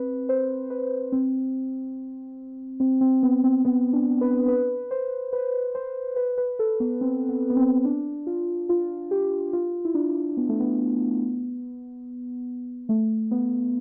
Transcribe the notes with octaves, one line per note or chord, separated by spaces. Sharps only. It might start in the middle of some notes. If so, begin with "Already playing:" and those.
Already playing: C4 B4
C5
B4
C4
C4
C4
B3
C4
B3
D4
B4
B4
C5
B4
C5
B4
B4
A4
B3
C4
B3
B3
C4
D4
F4
F4
G4
F4
E4
D4
B3
A3
B3
A3
B3